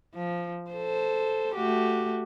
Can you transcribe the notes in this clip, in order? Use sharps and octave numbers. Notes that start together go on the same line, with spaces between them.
F3
A4 C5
A3 F#4 G4